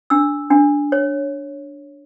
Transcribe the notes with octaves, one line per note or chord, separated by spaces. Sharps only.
D4 E6
D4
C#5